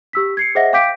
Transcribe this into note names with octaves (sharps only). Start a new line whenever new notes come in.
G4 E6 B6
G#6 C7 C#7
G#4 C5 D#5 E5 F#5 A#6
F5 G5 D6 G6 B6 D7